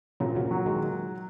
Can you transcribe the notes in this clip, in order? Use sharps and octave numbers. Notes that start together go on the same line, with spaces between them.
A#2 C#3 F#3
C#3 F#3
F#3
D#3 G#3